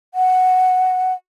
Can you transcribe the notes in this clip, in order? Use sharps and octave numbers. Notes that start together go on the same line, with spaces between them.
F#5